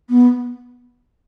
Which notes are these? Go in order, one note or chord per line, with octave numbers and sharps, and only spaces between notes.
B3